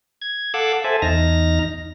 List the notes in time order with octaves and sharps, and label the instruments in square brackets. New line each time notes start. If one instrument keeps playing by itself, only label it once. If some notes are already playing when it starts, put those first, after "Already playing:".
[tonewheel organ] G#6
A4 F5 F#5 D6 E6 F#6
A4 C5 E5 G#5 A5
E2 D#4 F6 A#6